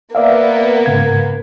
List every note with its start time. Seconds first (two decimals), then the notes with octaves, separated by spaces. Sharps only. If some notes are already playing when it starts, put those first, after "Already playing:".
0.15 A#3 B3 D5 E5 F5
0.86 G#2 C#3 G#6